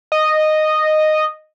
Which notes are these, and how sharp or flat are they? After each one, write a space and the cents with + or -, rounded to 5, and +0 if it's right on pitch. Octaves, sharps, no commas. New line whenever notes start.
D#5 -10